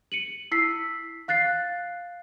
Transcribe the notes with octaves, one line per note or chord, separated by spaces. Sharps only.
C#7 D#7 F#7
E4 E6 B6 C7
F5 F#6 A6 C7